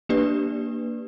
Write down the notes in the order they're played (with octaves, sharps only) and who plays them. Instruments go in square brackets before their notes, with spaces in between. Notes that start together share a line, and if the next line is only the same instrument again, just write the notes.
[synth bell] A#3 D4 G4 B4 D5